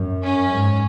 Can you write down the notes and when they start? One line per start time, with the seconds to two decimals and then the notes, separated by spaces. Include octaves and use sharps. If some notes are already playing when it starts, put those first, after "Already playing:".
Already playing: F#2
0.23 C#4
0.52 G#2